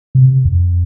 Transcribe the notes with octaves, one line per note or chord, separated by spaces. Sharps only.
C3
F2